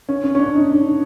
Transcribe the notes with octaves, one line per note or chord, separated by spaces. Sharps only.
C#4
C#4
C#4
D4
D#4
D4